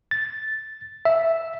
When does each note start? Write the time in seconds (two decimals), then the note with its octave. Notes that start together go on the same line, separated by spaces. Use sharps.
0.11 A6
1.05 E5